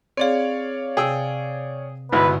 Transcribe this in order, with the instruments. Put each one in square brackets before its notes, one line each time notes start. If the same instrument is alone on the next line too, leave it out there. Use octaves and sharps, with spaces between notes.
[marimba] C4 G#4 [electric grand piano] C#5 D5 F5
[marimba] C3 [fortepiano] G#4 G5 E6
[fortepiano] G#1 B3 E4 [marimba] G2 D3 F#4 [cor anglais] B4